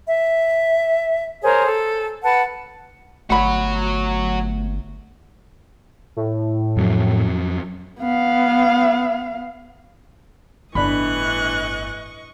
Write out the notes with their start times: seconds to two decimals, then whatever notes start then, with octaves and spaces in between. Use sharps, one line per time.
0.06 E5
1.42 G#4 A#4 C5 C#5
1.67 A4
2.24 B4 F#5 A5
3.30 G1 A3 F#4 C#5 F#5 B5
6.17 A2
6.77 F2 F#3
8.00 B3 F5
10.75 G1 A2 E3 D4 D#5 B5 C#6 F#6